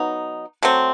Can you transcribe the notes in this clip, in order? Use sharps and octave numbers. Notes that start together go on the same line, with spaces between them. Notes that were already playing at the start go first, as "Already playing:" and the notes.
Already playing: F#3 B3 D#4
F#3 A3 C4